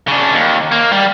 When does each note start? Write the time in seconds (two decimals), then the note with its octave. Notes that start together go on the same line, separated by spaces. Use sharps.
0.08 C#3 D4
0.33 D#2
0.71 A#3
0.92 G3